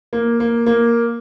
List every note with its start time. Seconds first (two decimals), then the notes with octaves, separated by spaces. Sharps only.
0.13 A#3
0.40 A#3
0.66 A#3